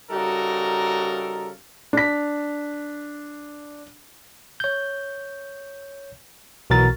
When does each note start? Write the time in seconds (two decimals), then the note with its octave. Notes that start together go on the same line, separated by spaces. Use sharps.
0.10 C#3 G3 D#4 F#4 A4 A#4
1.93 D4 B6
4.60 C#5 G6
6.70 B1 B2 E3 F#4 A#4 A6